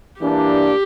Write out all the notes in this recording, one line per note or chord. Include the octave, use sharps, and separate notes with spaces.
E3 A#3 D4 G4